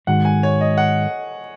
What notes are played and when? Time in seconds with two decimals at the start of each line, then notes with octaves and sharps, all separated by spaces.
0.07 G#2 D#3 G#3 F#4 F#5
0.25 G#5
0.43 C#5
0.61 D#5
0.78 F#5